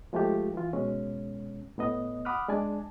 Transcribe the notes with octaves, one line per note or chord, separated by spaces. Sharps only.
F3 G#3 A3 F4 G4
E3 F4
B2 G#3 C#4
A2 B3 D#5
F#5 B5 D6 D#6 F6 F#6
G#3 D4 D5 G#5 A5